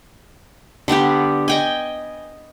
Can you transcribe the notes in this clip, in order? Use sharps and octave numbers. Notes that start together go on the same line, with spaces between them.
D3 G3 B3 G4
D#5 G5 G#5